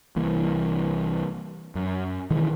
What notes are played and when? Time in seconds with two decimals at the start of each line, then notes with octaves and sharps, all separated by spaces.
0.16 C2 E3 A#3
1.75 F#2
2.31 B2 D#3 E3 G#3